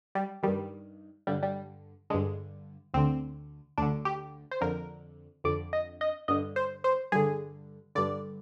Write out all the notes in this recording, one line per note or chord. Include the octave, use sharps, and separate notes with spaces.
G3
G2 D#3 G3
G2 D3 G3
G3
G2 D3 G#3
D2 D3 C4
D2 D3 D4
G4
C5
F2 D3 A#4
F2 D3 D5
D#5
D#5
G2 D3 D#5
C5
C5
G2 D3 G#4
G2 D3 D5